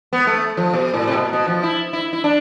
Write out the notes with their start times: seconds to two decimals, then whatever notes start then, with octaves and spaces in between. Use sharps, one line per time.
0.13 B3
0.27 A3
0.57 F3
0.73 B2
0.94 A2
1.07 C3
1.13 B2
1.33 B2
1.48 F3
1.63 E4
1.93 E4
2.13 E4
2.24 D4